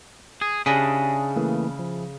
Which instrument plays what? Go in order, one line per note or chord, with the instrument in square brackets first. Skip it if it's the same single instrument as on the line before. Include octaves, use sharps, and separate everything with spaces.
[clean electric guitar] G#4
[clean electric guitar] C#3 [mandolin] D4 E4 G#4 [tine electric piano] G4 A#6 B6
[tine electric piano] E3 A3 A#3
F3